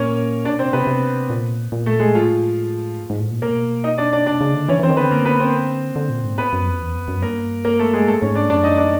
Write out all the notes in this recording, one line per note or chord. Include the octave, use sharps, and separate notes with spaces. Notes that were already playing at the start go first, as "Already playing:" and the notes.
Already playing: A#2 A#3 C#4 A#4 C#5
B2 D4 D5
C3 C4 C5
C3 B3 B4
C3
A#2
A#2
A3 A4
G#3 G#4
A2 F3 F4
G#2
G#2
A2
A#2
B2 A#3 A#4
D#4 D#5
D4 D5
D4 D5
C3 D4 D5
C#3
D3
E3 C#4 C#5
E3 C4 C5
D#3
B3 B4
D3
A#3 A#4
B3 B4
C4 C5
D3
A#2
G#2
B3 B4
F#2
F2
E2
F2
F#2
G2 A#3 A#4
A#3 A#4
A3 A4
G#3 G#4
G#2 A3 A4
G2
G#2 C#4 C#5
D4 D5
F#2 D4 D5
D#4 D#5
D4 D5